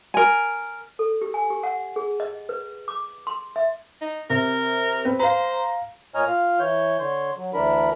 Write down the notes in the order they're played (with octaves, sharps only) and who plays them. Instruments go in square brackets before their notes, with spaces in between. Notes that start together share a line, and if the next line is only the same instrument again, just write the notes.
[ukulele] A#4 G#5
[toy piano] A4
G4
G#5
G4
F#5
G#4
D#5
B4
D6
C6
E5
[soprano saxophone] D#4
[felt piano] C3 [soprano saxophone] A#4
[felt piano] C4 B4
[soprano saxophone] C5 [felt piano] F5 A#5
[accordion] A#2 C#5 D#5 G#5 A#5 F6
F4 F5
E3 C#5 G6
D3 C#5 C6
F#3
D2 E3 D4 A#4 B5